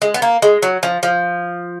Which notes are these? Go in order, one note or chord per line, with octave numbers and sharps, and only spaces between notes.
G#3
B3
A#3
G#3
F#3
F3
F3